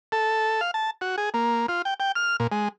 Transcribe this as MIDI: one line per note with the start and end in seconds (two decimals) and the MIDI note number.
0.12 0.61 69
0.61 0.71 77
0.74 0.91 81
1.01 1.16 66
1.18 1.29 68
1.34 1.66 58
1.68 1.82 65
1.85 1.94 79
2.00 2.12 79
2.16 2.36 89
2.40 2.47 46
2.52 2.68 56